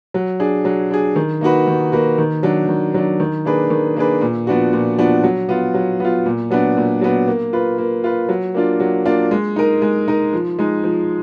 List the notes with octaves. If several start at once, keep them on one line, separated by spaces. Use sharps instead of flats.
F#3
D4 G#4
F#3
D4 G#4
D#3
A#3 D#4 F#4 B4
D#3
A#3 D#4 F#4 B4
D#3
F#3 D4
D#3
F#3 D4
D#3
A#3 D4 G#4 B4
D#3
A#3 D4 G#4 B4
A#2
F3 B3 D4 F#4
A#2
F3 B3 D4 F#4
F#3
B3 F4
F#3
B3 F4
A#2
F#3 B3 D4
A#2
F#3 B3 D4
A#3
F4 B4
A#3
F4 B4
F#3
A#3 D4 F4
F#3
A#3 D4 F4
G#3
D#4 A#4
G#3
D#4 A#4
F3
G#3 D#4
F3